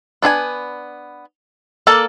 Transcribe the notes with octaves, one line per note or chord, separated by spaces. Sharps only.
B3 D4 G5 G#5
A#3 A4 D5